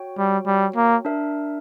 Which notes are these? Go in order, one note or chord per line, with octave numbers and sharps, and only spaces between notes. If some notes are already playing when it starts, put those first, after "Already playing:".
Already playing: F#4 C#5 G5
G3
G3
A#3
D4 A#4 E5